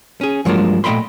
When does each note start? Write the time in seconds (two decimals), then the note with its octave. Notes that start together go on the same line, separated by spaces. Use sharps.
0.21 C#4 G#4
0.45 G2 F3 F#3 G#3 A#3 D4
0.84 A#2 A3 D#5 G5 B5 C6